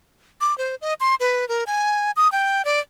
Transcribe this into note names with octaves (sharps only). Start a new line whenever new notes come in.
D6
C5
D#5
C6
B4
A#4
G#5
D#6
G5
D5